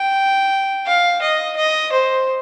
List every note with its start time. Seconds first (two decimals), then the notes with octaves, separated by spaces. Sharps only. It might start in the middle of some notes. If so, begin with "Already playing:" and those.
Already playing: G5
0.86 F5
1.22 D#5
1.57 D#5
1.92 C5